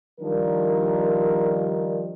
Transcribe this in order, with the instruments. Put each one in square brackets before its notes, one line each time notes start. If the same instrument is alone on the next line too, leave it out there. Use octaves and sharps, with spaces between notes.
[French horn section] D#3 F3 G3 D4 D#4 A#4